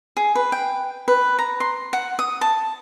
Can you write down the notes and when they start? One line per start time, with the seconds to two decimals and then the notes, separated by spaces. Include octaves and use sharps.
0.17 G#4
0.35 B4
0.52 G5
1.08 B4
1.39 A#5
1.60 C6
1.93 F#5
2.19 D#6
2.41 A5